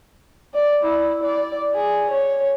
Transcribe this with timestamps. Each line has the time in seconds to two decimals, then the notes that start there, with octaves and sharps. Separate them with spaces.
0.54 D5
0.84 E4
1.23 D5
1.74 G#4
2.11 C#5